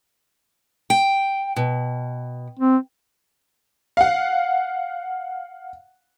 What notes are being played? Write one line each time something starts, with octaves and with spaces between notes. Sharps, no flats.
G5
B2
C4
F5 F#5